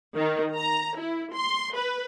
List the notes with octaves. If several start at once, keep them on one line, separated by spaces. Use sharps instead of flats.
D#3
A#5
E4
C6
B4